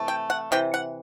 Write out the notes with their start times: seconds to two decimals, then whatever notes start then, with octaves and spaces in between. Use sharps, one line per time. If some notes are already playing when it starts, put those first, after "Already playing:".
Already playing: C3 E3 A3
0.08 G5
0.30 F#5
0.52 C3 E3 G5
0.74 F#5